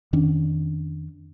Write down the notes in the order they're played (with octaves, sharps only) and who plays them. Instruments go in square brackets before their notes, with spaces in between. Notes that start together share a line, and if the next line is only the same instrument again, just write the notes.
[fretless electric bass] F2 D#3 C#4 D4